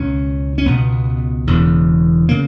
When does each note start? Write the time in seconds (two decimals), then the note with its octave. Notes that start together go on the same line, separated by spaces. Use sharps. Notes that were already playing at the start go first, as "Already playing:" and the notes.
Already playing: C#2 B2 C#4
0.58 C#4
0.65 C#2 B2 B3
1.47 E1 E2 C#3
2.29 C#3 A#3